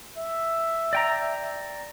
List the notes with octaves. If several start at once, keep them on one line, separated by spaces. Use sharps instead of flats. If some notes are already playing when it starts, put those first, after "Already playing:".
E5
D5 G5 A#5